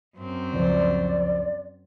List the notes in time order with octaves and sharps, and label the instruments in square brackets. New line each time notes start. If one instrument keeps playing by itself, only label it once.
[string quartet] F#2 C4
[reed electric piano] C#2 F3 C5 [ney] D5